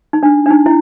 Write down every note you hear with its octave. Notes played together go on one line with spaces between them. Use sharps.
D#4
D4
D4
D#4
E4